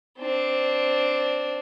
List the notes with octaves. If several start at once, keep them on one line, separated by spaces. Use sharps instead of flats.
C4 D4